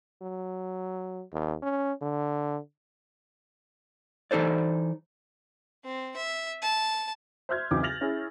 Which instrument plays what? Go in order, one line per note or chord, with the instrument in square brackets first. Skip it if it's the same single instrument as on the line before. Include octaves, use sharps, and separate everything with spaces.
[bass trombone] F#3
D#2
C#4
D3
[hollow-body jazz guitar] E3 D#4 A4 C5 D5
[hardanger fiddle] C4
E5
A5
[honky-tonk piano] C5 E5 F6 G6 G#6
B1 E2 C#3 C4 D#4 D6
F6 A6 A#6 F7 F#7
C#4 E4 G#4